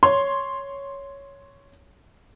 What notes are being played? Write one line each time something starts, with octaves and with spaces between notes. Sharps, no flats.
C#5 C6